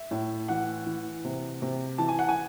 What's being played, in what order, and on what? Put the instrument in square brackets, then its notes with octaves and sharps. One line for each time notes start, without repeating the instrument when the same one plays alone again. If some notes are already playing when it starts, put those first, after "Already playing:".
Already playing: [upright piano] E5
A2
E3 F#5
E3
C3
C3
E3 A5
G#5
F#5
G#5